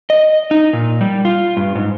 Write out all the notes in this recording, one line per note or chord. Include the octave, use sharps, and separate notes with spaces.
D#5
D#4
A#2
G3
F4
G2
G#2